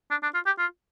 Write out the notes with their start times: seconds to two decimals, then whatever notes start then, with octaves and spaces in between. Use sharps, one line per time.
0.11 D4
0.23 D4
0.34 F4
0.46 G4
0.58 F4